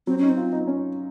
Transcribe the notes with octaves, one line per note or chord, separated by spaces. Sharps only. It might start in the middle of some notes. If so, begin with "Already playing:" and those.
F#3 C4
C#4 D#4
C4
F4
D#4
C#4